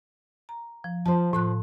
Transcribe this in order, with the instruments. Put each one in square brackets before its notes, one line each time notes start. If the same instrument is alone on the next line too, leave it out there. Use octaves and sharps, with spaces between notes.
[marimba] A#5
F3
[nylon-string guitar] F3 C5 [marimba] A5
[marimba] A2 C6 F#6 [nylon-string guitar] F3